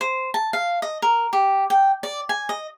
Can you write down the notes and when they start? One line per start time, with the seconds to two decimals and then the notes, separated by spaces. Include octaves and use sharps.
0.01 C5
0.34 A5
0.53 F5
0.82 D#5
1.02 A#4
1.33 G4
1.70 G5
2.03 D5
2.29 G#5
2.49 D#5